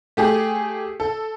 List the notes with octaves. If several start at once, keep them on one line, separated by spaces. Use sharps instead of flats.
A3 G4 G#4
A4